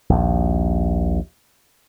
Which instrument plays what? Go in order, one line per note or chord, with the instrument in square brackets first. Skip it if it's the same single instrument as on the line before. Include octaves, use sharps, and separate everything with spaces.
[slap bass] A#1 D#2